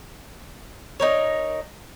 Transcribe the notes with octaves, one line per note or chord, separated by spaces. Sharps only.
D#4 A#4 C#5